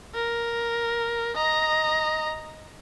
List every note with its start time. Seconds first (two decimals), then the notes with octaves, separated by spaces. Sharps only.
0.15 A#4
1.36 D#5 A#5